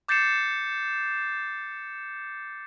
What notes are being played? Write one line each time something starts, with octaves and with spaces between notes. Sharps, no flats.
D6 G6 A6 C7 C#7 E7